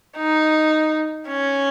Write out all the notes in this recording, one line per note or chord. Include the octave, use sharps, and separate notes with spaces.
D#4
C#4